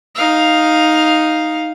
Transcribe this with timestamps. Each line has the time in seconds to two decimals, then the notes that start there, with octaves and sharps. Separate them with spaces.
0.15 D#4 F5